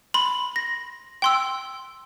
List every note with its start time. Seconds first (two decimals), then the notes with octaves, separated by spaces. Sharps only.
0.14 B5 C6 F#7
0.56 A#6
1.22 G5 C6 E6